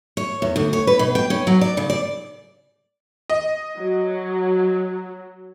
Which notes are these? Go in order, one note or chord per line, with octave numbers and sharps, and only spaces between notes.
C#5
E2
D2
C#5
B4
B2
G5
C#4
F#3
D5
C#3
D5
D#5
F#3